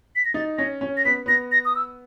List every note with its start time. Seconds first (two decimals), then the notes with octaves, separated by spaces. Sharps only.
0.16 B6
0.25 A#6
0.34 D#4 A6
0.58 C#4 A#6
0.81 C#4
0.97 A#6
1.05 B3 B6
1.26 B3 A#6
1.52 A#6
1.65 D#6
1.75 E6